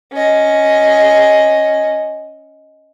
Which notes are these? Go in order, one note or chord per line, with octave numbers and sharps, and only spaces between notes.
C#4 D#5